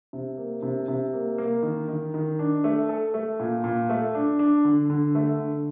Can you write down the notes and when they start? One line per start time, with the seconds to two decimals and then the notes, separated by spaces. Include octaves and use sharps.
0.13 C3
0.37 A#3
0.63 C3
0.88 C3
1.13 A#3
1.38 A#3
1.63 D#3
1.88 D#3
2.14 D#3
2.39 D4
2.64 A3
2.89 A4
3.14 A3
3.40 A#2
3.64 A#2
3.89 A3
4.15 D4
4.39 D4
4.65 D3
4.90 D3
5.15 A3
5.40 D3